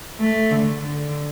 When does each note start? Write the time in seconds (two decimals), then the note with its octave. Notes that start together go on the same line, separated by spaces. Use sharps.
0.20 A3
0.51 D3
0.81 D3